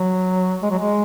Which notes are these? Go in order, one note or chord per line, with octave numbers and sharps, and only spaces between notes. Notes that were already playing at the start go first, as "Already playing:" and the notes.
Already playing: F#3
G#3
F#3
G#3